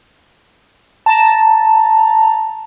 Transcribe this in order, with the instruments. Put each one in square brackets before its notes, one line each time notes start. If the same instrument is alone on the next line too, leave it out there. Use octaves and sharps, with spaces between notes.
[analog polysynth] A5 A#5